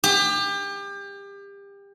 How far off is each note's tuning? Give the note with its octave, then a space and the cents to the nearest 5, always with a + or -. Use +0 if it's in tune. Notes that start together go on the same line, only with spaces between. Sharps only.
G4 +30